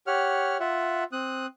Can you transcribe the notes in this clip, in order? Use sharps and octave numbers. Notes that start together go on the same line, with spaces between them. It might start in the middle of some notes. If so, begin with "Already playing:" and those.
G4 C#5 F#5 F6
F4 E5 F#5
C4 D#6 F#6